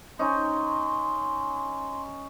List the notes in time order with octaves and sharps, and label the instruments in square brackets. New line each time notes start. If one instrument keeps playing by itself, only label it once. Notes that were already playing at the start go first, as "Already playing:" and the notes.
[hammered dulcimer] C#4 D#4 [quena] C6